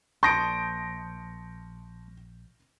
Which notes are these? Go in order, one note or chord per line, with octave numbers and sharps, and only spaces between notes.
A#1 A5 C6 C#6 D#6 G6 A#6 D7